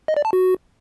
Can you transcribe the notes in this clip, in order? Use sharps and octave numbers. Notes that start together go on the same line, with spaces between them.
D#5
D5
A5
F#4